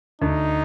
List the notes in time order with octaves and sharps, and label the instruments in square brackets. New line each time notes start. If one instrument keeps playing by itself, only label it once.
[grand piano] D2 [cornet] D#4